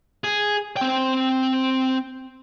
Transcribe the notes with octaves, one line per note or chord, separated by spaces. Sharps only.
G#4
C4 G5